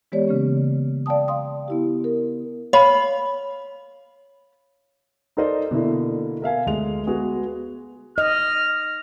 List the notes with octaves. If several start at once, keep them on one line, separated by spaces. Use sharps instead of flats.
E3 G#3 B3 G4 C#5 D5
C#3 A#3 C#4
D5 F5 G5 A5 D#6
D5 F5 C6 D#6
B3 E4 G4
A#4
C#5 F5 B5
D#4 A4 A#4 C5 D5 D#5
B2 D3 A#3 E4
A#4 E5 F5 G#5
D2 G#3 F7
G#3 B3 F#4 G#4
D#5 F6